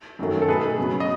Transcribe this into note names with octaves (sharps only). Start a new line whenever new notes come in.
F#2 D#3 F#3 A3
A4
B2 A3 G#4 B4
C#3 F#3 B3
D#5